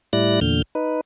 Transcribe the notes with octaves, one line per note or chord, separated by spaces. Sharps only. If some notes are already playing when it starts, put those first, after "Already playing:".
A2 G3 E4 D5 F#6 A#6
E2 A#2 D3 F6 G6
D#4 B4